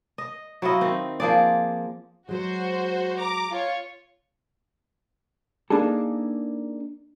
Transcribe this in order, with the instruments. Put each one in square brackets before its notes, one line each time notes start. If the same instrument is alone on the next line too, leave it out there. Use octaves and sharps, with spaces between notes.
[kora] D#5
F#3 E4 F4 D#5
D#3 C4
F3 A#3 G#4 D5
[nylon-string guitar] F#3 G#3 [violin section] F#4 C5
[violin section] A#5 D6
F4 C#5
[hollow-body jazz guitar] A#3 D4 D#4 G#4 A4